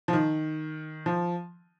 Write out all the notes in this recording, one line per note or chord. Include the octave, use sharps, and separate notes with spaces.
F3
D#3
F3